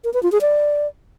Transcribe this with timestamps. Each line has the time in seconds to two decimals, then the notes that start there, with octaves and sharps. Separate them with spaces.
0.04 A#4
0.14 B4
0.23 F4
0.32 G#4
0.41 D5